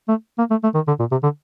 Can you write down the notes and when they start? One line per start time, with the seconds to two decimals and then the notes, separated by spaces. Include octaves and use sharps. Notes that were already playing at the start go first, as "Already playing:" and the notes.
0.08 A3
0.38 A#3
0.50 A3
0.63 A3
0.74 D#3
0.87 D3
0.99 A#2
1.11 C3
1.23 D3